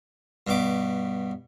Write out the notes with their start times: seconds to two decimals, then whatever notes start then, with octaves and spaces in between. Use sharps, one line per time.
0.47 G2 B2 D6